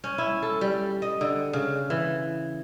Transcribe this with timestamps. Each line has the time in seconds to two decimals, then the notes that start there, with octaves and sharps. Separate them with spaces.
0.04 C#4
0.18 E4
0.42 A4
0.61 G3
1.02 D#5
1.21 D3
1.53 C#3
1.90 E3